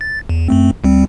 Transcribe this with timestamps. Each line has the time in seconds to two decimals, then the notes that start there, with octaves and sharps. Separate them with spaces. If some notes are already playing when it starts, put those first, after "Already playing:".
0.01 A6
0.29 E2
0.48 F#2 A3 C4
0.84 D2 G3 C4